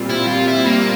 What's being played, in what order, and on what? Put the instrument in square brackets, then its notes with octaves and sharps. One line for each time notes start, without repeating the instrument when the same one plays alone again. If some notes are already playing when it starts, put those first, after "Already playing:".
Already playing: [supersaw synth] A#2 G3 C4 F4
[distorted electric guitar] E4
F4
E4
A#3